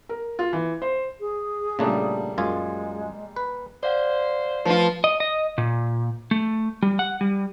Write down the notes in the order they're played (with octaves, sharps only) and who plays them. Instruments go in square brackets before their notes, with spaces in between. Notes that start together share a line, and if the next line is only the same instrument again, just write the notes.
[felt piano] A#4
F4
E3
C5
[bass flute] G#4
[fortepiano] A#2 G3 [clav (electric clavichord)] C#3 A3 D4
[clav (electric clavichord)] F#2 F4 G#5 [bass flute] G#3
[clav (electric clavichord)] B4
[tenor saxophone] C5 [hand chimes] D5 F5 F#5
[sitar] F3 F4 [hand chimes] A3 B4
[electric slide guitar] D#5
D#5
A#2
A3
G3
F#5
G3